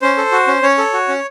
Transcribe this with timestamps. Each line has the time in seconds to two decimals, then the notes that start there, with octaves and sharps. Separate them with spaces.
0.02 C#4 C5
0.17 A4
0.32 F#4
0.47 C#4
0.63 C#4 C#5
0.78 A4
0.93 F#4
1.08 C#4